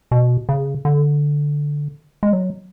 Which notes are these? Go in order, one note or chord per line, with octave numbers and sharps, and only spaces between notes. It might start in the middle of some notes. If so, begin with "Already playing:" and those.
B2
C#3
D3
G#3
F#3